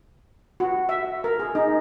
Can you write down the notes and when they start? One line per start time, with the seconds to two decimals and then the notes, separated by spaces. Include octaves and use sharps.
0.60 F#4
0.89 E5
1.24 A#4
1.39 G#4
1.55 D#4